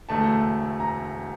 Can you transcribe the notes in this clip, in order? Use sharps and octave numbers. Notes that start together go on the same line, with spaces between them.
E1 D2 D3 A3 A5
A#5